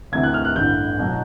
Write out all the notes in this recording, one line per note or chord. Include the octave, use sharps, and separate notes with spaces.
D2 C3 E3 G#6
F#6
F6
F#6
A1 G2 D3 G6
B2 F#3